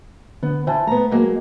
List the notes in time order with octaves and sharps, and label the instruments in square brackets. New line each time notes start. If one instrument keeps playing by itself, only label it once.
[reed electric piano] D3 [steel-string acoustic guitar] B3
[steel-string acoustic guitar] E3 [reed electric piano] C5 G#5 A5
[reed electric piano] A3 [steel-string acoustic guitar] B3 A#5
[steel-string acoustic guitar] F#3 G#3 A#3